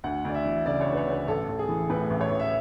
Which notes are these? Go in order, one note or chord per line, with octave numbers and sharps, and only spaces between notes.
D2 F#5
D2 D5
E5
E3
C#3 D5
C#5
D2
B4
C#5
D2
B4
A1 A4
A1
G#4
E3
A2 B4
A1
C#5
A1
E5